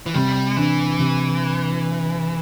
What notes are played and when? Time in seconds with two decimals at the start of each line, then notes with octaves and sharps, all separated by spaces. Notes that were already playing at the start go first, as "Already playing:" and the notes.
0.06 E3
0.14 C3 G3
0.57 E3 D4
0.99 C3